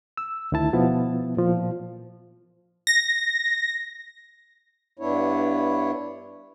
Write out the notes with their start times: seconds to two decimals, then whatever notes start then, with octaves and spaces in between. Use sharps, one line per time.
0.17 E6
0.52 D2 D#3 E4 A5
0.73 B2 F3 B3 E4
1.37 A#2 F3
2.87 A#6
4.99 G2 B3 D4 E4 C#5